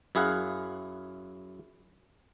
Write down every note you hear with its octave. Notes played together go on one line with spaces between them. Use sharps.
F#2 E4 G#4 F5 F#5